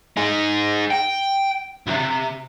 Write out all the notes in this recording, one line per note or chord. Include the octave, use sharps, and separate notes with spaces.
D#4 G#4
G5
B1 C3